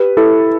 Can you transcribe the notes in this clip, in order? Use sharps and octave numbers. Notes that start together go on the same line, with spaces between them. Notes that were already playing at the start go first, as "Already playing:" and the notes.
Already playing: G4 B4
E4 A4